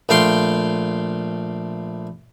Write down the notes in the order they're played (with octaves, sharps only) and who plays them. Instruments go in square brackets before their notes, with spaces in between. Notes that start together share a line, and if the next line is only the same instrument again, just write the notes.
[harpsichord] A#1 A3 F5 G5 C6